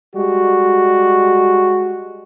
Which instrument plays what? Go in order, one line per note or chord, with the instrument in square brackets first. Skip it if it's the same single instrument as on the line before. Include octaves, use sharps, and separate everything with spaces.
[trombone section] G3 G#3 F#4